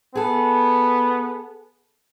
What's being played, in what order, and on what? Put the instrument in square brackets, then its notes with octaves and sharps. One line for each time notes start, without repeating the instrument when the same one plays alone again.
[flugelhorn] B3 [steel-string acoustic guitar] G#4 A4